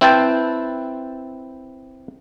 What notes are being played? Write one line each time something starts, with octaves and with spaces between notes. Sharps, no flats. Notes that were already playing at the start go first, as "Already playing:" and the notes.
C4 E4 B4 C5 G5 A5